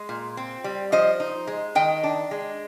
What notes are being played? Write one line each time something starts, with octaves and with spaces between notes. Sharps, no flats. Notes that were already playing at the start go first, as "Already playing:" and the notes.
Already playing: G#3
A#2
C4
G3
F3 C5 D#5
D#4
G#3
D#3 D#5 G5
D4
G#3